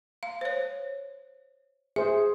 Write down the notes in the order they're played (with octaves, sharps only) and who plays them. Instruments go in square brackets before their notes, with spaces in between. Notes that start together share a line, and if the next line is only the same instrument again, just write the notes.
[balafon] F5
C5 C#5
[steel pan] G#4 C5 [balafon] E5